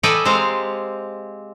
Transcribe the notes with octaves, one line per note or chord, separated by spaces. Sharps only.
A4 B4 D5 D#5 G5 G#5
G#3 C4 G4 C5 F5 A#5